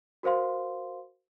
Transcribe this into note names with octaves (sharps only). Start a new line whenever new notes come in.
F#4 A#4 C5 F5 C6